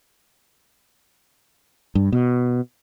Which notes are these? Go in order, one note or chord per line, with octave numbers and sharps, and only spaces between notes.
G2
B2